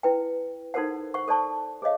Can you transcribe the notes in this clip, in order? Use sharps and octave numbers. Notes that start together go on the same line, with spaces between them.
E4 B4 G5
D#4 F#4 A4 A#4 C5 F#5
C5 F#5 C#6
A4 C5 D5 A5 C#6
G#4 C5 C#5 D#5 F5